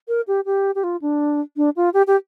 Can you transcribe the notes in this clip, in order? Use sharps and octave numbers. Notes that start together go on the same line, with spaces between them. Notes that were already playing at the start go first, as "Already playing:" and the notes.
A#4
G4
G4
G4
F4
D4
D4
F4
G4
G4